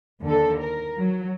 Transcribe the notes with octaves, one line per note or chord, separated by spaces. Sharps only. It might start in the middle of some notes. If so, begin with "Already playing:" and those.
D#2 D3 A4
A#4
F#3